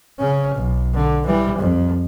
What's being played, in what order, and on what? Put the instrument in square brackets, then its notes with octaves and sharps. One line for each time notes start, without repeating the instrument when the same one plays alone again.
[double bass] C#3 C#4
B1
D3
E3 G3
F2